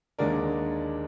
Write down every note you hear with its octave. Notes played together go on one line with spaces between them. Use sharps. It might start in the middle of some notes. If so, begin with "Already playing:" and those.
D#2 D3 G#3 D4 A#4 D5